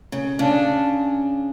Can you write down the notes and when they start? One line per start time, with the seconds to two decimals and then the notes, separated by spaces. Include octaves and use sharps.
0.12 C#3
0.39 C#3 D4